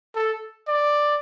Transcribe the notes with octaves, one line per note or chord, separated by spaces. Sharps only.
A4
D5